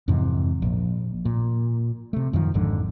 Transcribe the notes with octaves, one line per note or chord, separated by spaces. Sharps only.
F2 G#2 C3 E3
A#1
A#2
C3 A3
F#2 D#3 F3
G#1 F2 G#2 D3